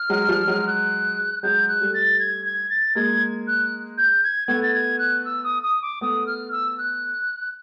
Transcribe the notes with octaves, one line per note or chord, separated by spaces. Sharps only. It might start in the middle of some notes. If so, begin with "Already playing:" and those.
Already playing: F6
F#3 G#3
F3 G3
F#3 G#3
F#6
F#3 G#3 G6
F#6
G3 A3
A6
G#6
G#6
A6
G#3 A#3 G#6
F#6
G6
G#6
A3 B3 G#6
A6
G#6
F#6
E6
D#6
D#6
D6
A3 B3 D#6
F6
E6
F#6